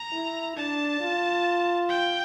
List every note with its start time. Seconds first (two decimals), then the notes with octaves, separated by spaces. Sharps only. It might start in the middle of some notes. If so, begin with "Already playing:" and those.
Already playing: A#5
0.13 E4
0.57 D4 A5
1.01 F4
1.89 G5